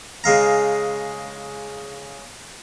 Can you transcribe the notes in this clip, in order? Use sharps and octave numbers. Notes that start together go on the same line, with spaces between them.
C#3 G#3 F5 A#5